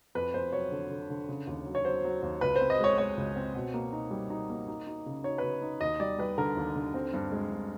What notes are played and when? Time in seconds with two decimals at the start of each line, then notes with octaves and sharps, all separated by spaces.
0.15 F2 B4
0.34 F2 C5
0.53 F#3 C#5
0.71 D3
0.90 D3
1.10 D3
1.29 C#3
1.47 D#2
1.66 F#3
1.75 C#5
1.85 F#3 C5
2.04 F#3
2.23 D#2
2.41 C#2 B4
2.56 C5
2.61 C4
2.70 D#5
2.80 G#3 C#5
2.98 G#3 C#5
3.18 C#2
3.36 C4
3.55 B2
3.74 A#3
3.93 D#4
4.11 G3
4.30 D#4
4.50 A#3
4.68 D#4
4.87 D#4
5.06 C#3
5.24 D#4 C#5
5.38 C#3 B4
5.62 D#4
5.81 D#2 D#5
6.00 G3 D5
6.18 G3 B4
6.38 D3 A#4
6.57 D#2
6.76 D3
6.94 C4
7.13 G2
7.32 G#3
7.50 G2